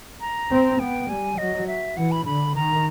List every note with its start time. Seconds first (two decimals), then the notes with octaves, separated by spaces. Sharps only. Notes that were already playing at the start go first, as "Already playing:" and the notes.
0.21 A#5
0.51 C4
0.79 B3 G5
1.09 G3 G#5
1.38 F#3 D#5
1.67 E5
1.97 E3 F#5
2.12 B5
2.26 D3 B5
2.55 D#3 A#5